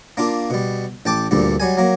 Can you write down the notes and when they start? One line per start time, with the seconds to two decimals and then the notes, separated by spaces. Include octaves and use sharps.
0.17 A#3 D4 F4
0.50 B2 G3
1.06 A1 G5 A5 D6
1.31 D2 G2 A#2 G3
1.60 F#3 G3 G#5
1.77 F#3 A#3